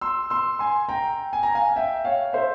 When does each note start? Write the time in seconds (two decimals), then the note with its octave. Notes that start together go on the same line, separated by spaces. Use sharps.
0.01 C6 E6
0.30 C6 E6
0.59 G#5 C6
0.89 G5 A#5
1.33 G#5
1.43 A#5
1.54 F5 G#5
1.76 E5 G5
2.05 C#5 F5
2.33 C5 E5